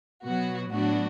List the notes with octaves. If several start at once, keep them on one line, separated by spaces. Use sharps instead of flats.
B2 F#3 B3 F#4
A2 F#3 B3 D4 F#4